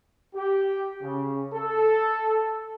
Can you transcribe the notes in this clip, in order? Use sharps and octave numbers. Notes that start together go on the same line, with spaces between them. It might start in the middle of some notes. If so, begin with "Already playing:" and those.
G4
C#3
A4